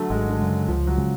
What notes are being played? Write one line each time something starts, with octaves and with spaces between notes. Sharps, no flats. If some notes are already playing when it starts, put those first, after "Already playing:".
Already playing: D3 F#3 A3
G#1 G#3
D3
F#2 C#3 G#3
C#2 F3
F#3
C#3 G#3